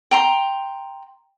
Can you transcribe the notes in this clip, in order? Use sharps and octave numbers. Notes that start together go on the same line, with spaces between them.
G5 A#5 C6